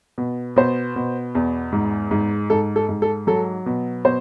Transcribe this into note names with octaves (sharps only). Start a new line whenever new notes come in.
B2
B2 C5
B2
E2
G#2
G#2
G#2 A4
A4
G#2
A4
F#3 A4
B2
B2 C5